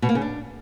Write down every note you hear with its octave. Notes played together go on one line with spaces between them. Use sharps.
B2
A#3
C#3
D4